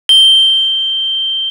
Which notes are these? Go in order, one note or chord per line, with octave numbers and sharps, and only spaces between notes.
G7